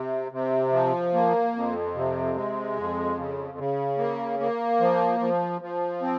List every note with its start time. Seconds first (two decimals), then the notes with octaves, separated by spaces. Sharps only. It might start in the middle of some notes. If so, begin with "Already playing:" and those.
Already playing: C3
0.32 C3
0.73 F3
1.14 A#3
1.54 F2
1.95 C3
2.35 G#3
2.76 F2
3.17 C#3
3.58 C#3
3.98 A#3
4.39 A#3
4.80 F3
5.20 F3
5.61 F3
6.02 C4